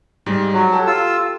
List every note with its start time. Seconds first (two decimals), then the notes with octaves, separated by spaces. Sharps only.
0.26 G#2 G3 G#3
0.53 F#3
0.72 G4 A4 A5
0.87 F4 E6